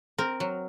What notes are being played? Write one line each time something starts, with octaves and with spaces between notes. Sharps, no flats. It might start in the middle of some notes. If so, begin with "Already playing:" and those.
C4 A#4
F#3